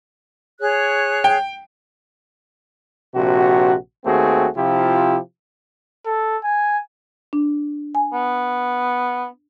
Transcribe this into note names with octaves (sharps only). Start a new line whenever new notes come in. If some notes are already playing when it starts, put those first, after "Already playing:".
G#4 C#5 F#6
G5
A#1 C3 F#4
D#2 A3 C4 F#4 G#4
C3 F3 E4 F4 G4
A4
G#5
D4
G#5
B3